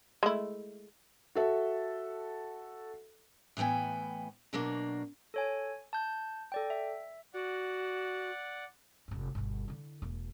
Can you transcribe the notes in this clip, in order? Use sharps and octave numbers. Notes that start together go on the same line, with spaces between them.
G#3 A3 E4
F#4 A4 E5
A2 E3 B3 G5 G#5
B2 F#3 A#3 D4
A4 C#5 G#5
A5 G6
A4 D5 G5
E5
F#4 D5 F#5
F1 G#2
G1 B2
D3 E4
E1 A#3